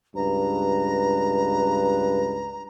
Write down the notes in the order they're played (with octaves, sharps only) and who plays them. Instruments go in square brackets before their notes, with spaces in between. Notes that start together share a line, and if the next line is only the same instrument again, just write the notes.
[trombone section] C#2 G2 B4 [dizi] A#5